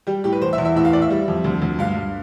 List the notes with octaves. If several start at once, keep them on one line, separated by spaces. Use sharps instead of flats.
G3 G4
A2 G4
B4
E2 C5
E5
E2
E5
A2 E5
F5
A2 D5
E5
G3
F2
D2
D2
G2 F5
G2